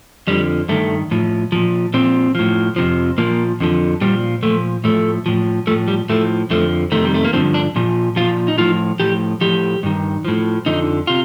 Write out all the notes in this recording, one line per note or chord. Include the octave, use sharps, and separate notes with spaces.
F2 D3 F3 G3
G2 D#3 A3
A2 F3
A#2 F3
A#2 F3 C4
A2 F3
F2 C3 F3
A#2 F3 A#3
F2 D3 F3
A#2 F3 G3
A#2 F3 A3
A2 F3 A3
A2 F3
A2 F3 A3
G3
A2 F3 A3
F2 D3 F3 A3
F2 C3 D#3 A3
G3
A3
A#3
G2 D3 F3 C4
D4
A#2 F3
A#2 F3 F4
D#4
A2 F3 F4
A2 F3 G4
A2 F3 G4
G2 D#3
A2 F3
F2 D3 F3 D#4
C3 F4